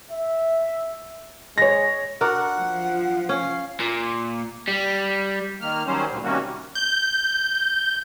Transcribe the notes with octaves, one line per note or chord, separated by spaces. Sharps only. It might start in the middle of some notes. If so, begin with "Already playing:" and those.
E5
G#3 C#5 A#6
D4 F#4 A#4 F#5
F3
C#4 F5
A#2
G3
D#3 A#3 F6
D#3 F#3 G3 C#4 C5
D2 A#2
C3 D#3 G3 A#3 C#4 F#4
G6